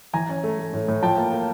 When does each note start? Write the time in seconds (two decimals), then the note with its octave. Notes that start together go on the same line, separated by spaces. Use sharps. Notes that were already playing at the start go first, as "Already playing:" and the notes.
0.14 E3 G#5 A#5
0.29 C#4
0.44 A3
0.59 A3
0.74 A2
0.88 A2
1.03 F3 G5 A5
1.18 A#3
1.32 A#3